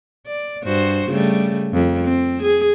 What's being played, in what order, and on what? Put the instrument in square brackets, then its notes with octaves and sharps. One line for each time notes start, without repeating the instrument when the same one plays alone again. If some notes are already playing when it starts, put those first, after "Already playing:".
[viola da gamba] D5
G2 F#4 C5
C#3 G3 A3
F2
C4
G#4